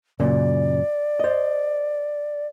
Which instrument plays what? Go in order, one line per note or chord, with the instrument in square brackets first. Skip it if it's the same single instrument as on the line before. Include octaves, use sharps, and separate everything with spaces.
[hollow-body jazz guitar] F#2 A#2 C#3 [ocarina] D5
[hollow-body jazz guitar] C5 D#5